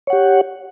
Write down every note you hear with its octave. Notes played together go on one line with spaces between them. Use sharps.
G4 C#5 F#5